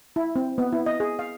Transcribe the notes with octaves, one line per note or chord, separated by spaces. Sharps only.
E4
C4
B3
E4
D#5
G#4
F5